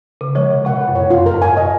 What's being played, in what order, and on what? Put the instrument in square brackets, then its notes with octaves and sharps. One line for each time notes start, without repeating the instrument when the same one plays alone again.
[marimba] C#3 [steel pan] A#4
[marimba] F3 G#3 [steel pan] C#5
[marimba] C3 [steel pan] A#4
[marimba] C3 [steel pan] F#5
[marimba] A#2
[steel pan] A#4
[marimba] F#2
[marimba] F2 [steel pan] C#5
[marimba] F#2 [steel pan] F4
[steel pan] A#4
[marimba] G#2
[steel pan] G#5
[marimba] C3 [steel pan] D#5